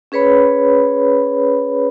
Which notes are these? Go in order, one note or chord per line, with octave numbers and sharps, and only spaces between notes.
C#4 G#4 B4 C#5 B5